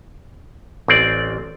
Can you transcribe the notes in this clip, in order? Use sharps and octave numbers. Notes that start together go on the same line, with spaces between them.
A1 C4 D5